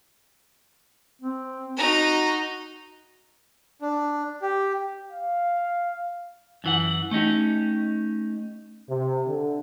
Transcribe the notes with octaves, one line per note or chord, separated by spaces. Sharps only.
C4
D#4 F#4 A#5
D4
G4
F5
F#2 E3 F#5
A3 C#4 D#4 G4
C3
D3